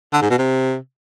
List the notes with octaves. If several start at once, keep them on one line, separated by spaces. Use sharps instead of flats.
D3
G#2
B2
C3